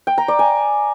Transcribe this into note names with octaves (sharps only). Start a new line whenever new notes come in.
G5
A#5
D5
G#5